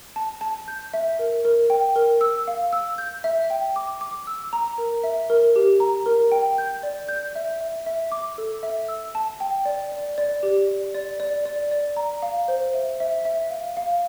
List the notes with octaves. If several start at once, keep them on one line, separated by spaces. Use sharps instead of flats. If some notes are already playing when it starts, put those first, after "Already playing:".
A5
A5
G6
E5
A#4
A#4
G5
A#4
E6
F5
E6
G6
E5
G5
D6
D6
E6
A#5
A#4
E5
A#4
G4
A#5
A#4
G5
G6
D5
G6
E5
E5
E5
D6
A4
E5
E6
A5
G5
D5
D5
D5
G4
D5
D5
D5
D5
D5
A#5
F5
C5
E5
E5
E5
F5
F5